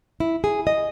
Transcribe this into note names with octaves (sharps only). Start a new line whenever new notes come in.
E4
G#4
D#5